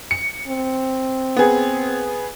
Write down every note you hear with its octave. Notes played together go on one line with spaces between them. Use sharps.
C#7
C4
B3 G#4